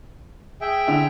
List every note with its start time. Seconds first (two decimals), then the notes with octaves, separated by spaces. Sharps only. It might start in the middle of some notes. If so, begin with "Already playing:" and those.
0.61 G#4 E5 G5
0.87 D3 E4